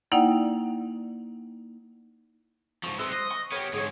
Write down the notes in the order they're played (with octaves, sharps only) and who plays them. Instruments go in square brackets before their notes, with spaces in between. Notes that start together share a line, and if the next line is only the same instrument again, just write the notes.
[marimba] A#3 D#4 E4 D5 F#5 G5
[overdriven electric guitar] G#2 F3 [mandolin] C#6
[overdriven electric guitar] C3 G#3 [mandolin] B4 C5 E6
[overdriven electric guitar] D#5
[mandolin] C#6
[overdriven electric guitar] B3 G4 [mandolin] A#4 C#5
[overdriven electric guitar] G#2 D3 [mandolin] G#4 C#5